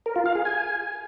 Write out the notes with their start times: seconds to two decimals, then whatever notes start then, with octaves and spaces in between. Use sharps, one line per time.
0.06 A#4
0.16 F4
0.26 F5
0.35 G#4
0.45 G#5